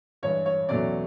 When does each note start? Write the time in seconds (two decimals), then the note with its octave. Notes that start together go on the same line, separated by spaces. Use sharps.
0.23 G2 E3 G#3 C#5
0.46 C#5
0.69 E2 B2 F#3 A3 C#4 D5